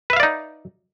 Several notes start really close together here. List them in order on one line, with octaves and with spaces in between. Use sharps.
B4 E5 F5 D5 D#4